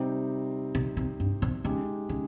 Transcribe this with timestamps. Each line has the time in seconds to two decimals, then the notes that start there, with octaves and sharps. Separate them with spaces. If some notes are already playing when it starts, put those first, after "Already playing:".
Already playing: C3 G3 C4 D#4 G4
0.75 C3
0.97 C3
1.20 G2
1.42 C3
1.64 C#3 G#3 D#4 G4
2.09 C#3